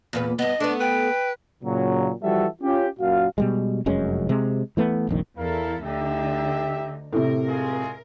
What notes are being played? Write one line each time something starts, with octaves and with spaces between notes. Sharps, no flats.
E2 A#2 B4
G2 B3 D#5
A3 B3 D4
B4 G5
A#2 C#3 F#3
E3 F3 G3 F#4 A4 E5
C#4 F4 G4
F#2 A#2 F#4 F5
B2 G3 G#3
F1 F#2 G#3 C#4
C3 G#3
E3 A3 B3
F1 A#1 D#3
E2 E4 A4 A#4 F5
D2 D3 D#4 G4 E5
A2 C3 A#4
G#3 F4 G#4